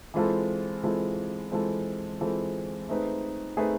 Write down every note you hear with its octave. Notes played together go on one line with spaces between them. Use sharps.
E3 G#3 C4 F4 A4
E3 G#3 C4 F4 A4
E3 G#3 C4 F4 A4
E3 G#3 C4 F4 A4
A3 C4 D#4 G#4 B4
A3 C4 D#4 G#4 B4